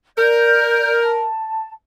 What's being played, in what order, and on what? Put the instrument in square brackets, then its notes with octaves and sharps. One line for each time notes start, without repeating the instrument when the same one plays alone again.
[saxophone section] A#4 [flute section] D5 G6
[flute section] A5